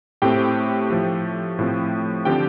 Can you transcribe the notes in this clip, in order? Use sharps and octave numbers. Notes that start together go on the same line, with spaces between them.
A2 A3 C4 G4 G5
A2 F3 A3
A2 F3 C4
D3 F3 C4 G4 G5